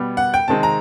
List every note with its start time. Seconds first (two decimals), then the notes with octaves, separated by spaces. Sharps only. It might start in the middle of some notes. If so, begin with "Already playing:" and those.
Already playing: B2 G3 B3
0.17 F#5
0.34 G5
0.48 C3 D#3 G#3 C4 A5
0.63 A#5